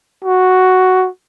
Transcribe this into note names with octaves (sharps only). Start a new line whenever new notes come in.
F#4